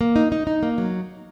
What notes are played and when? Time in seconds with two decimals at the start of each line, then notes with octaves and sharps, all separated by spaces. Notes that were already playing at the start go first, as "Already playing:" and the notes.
0.01 A#3
0.16 D#4
0.32 D#4
0.47 D#4
0.63 A#3
0.78 F#3